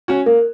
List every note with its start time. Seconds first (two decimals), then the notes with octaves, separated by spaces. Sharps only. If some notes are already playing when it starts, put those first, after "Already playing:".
0.08 C#4 F#4
0.26 A#3 A#4